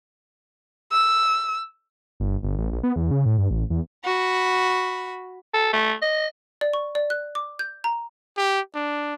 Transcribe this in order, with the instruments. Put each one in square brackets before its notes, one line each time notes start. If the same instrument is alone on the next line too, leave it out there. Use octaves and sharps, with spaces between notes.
[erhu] E6
[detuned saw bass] G1
G1
A1
A#1
B3
E2
C#3
A2
G2
A1
E2
[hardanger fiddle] F#4 B5
[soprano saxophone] A4
A3
D#5
[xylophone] D5
C#6
D5
F#6
D6
G6
A#5
[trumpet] G4
D4